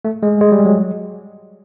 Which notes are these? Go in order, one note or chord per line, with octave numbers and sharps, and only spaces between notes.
A3
G#3
G#3
G3
F#3